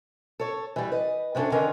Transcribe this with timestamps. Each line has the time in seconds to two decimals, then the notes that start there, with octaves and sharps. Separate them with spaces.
0.40 A4 C#5
0.76 E3 G3
0.92 B4 D#5
1.35 C3 B3 C#4 D4 A4
1.52 D3 D#3 C#4 F4 A#4 B4